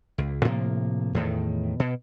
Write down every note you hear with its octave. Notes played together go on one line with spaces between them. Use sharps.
C#2
A2 C3 F3 A#3
E2 A2 D#3
B2